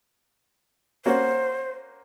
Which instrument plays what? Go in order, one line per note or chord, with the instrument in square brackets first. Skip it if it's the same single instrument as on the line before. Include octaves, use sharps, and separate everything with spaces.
[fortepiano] A#3 C#4 F#4 [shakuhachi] C5